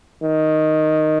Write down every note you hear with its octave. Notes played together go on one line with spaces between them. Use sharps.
D#3